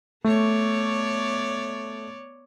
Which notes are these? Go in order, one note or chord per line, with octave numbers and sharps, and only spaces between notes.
A3 B3 C#5 D5